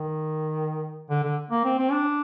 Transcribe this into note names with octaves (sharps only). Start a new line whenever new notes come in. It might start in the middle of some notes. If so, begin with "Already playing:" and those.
Already playing: D#3
D3
D3
A#3
C4
C4
D4